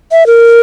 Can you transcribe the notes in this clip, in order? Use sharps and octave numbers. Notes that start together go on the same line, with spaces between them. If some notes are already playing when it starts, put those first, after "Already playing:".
E5
A#4